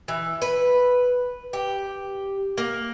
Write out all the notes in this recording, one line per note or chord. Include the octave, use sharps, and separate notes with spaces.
E3
B4
G4
A#3